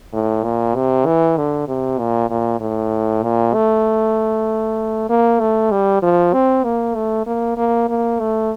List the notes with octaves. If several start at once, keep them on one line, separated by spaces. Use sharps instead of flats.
A2
A#2
C3
E3
D3
C3
A#2
A#2
A2
A#2
A3
A#3
A3
G3
F3
C4
A#3
A3
A#3
A#3
A#3
A3